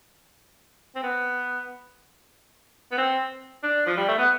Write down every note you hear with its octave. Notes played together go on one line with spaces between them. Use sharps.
C4
B3
B3
C4
D4
F3
G3
A3
B3